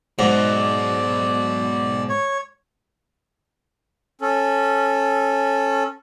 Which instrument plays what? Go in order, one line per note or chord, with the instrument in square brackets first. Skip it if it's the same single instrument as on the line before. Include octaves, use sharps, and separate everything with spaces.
[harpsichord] G#2 [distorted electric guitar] B2 F#3 [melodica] D5
[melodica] C#5
[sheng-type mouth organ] C#4 A4